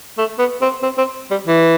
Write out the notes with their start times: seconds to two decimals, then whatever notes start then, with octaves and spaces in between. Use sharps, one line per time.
0.18 A3
0.39 B3
0.61 C4
0.83 C4
0.98 C4
1.31 G3
1.47 E3